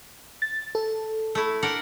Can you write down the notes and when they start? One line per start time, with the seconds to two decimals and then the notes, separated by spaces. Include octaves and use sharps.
0.42 A6
0.75 A4
1.35 A3 E4
1.62 D4 A#4 F#5